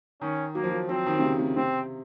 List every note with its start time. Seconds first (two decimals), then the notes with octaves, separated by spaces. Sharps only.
0.21 D#3 C#4
0.55 F#3 A#3
0.64 F3
0.71 F#3
0.89 F#3 C4
1.06 D#3
1.19 C3
1.23 C#3
1.40 C3
1.56 C3 C4